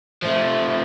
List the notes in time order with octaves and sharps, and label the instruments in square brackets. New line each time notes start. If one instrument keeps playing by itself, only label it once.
[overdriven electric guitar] F3 A3